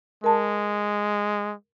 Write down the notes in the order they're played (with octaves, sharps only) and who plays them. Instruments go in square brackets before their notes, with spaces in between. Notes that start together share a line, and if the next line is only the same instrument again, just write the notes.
[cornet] G#3 [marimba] A#4 A5